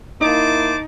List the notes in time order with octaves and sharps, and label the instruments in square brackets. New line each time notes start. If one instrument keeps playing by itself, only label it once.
[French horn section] A#3 E4 [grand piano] D#4 [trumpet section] C5 A5 D6